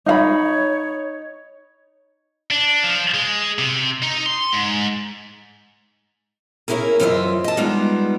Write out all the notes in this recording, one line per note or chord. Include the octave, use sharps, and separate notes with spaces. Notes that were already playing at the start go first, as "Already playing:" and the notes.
D#4 C#5 F5 B5
D4
F3
G#3
C3
D#4
C6
G#2
A#3 C#4 D#4 E4 G#4 A#4
F#2 E3 F4 C5 D#5 E5
D#5 A5
G3 G#3 B3 D#4 F4